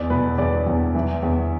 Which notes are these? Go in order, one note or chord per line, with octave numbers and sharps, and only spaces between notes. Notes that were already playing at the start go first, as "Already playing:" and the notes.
Already playing: E2 D5
B2 B4
E2 D5
E2
E3
E2